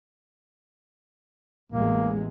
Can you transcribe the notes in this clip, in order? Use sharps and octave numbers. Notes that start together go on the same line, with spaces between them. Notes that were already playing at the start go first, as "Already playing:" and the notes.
A1 E2 G#3 A#3